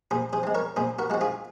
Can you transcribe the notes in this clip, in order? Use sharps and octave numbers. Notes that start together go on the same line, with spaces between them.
A#2 G#4 C5
G#4 C5
G#3 C4
A#4 C#5
A#2 G#4 C5
F#4 A#4
G#3 C4 F#4
F4 G#4